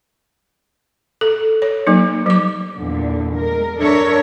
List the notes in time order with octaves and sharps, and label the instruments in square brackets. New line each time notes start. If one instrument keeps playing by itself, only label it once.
[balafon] A4
C#5
F#3 A#3 D#4
F#3 D6
[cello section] E2 A#2 D3
G#3 A#4
D4 A4 A#4 C#5 E5